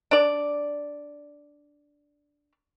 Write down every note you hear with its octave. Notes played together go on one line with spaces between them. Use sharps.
D4 D5